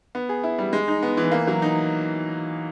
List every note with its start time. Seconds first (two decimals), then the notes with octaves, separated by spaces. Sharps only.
0.15 B3
0.29 G#4
0.44 E4
0.58 G3
0.73 G#3
0.88 D#4
1.03 B3
1.17 E3
1.32 A#3
1.47 F#3
1.62 D#4